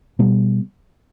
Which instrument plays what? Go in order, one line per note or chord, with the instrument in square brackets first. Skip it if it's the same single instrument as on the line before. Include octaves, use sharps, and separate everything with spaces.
[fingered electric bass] B2 G3 B3